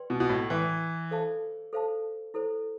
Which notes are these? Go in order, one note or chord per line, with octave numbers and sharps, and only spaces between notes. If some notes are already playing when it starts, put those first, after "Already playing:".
Already playing: B4 D5 G5 C6
B2
B2
A2
E3 B4 D5 G5 C6
A4 C5 F5 A5
A4 C5 F5 A5
E4 A4 C5